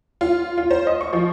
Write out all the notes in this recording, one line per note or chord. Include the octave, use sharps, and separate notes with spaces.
F4
F4
C5
D#5
C#6
F3